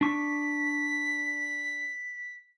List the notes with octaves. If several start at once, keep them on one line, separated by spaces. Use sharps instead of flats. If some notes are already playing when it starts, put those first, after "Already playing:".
D4 C#6 B6